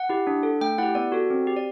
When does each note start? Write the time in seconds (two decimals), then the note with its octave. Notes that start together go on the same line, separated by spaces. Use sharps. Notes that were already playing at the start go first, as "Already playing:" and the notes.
Already playing: F#5
0.09 E4 G4
0.27 D4
0.43 A4
0.61 A3 G5
0.78 E4 G4 F#5
0.95 B3 D5
1.12 F#4 A4
1.30 C4
1.47 G4
1.57 D5